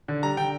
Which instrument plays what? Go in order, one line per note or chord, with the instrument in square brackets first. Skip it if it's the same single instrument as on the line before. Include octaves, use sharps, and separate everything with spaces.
[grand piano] D3
G3 A#5
D3 G5